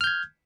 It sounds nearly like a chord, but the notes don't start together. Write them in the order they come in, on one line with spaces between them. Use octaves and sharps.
F6 G6 G#6